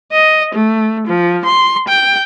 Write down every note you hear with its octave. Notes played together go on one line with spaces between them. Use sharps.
D#5
A3
F3
C6
G5